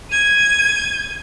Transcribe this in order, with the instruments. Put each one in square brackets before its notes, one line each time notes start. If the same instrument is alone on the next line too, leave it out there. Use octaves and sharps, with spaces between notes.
[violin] G#6 D#7